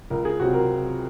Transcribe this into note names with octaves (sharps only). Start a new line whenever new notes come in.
C#2 A#4
G#4
C3 F#3 C4 F4 F#4
A#4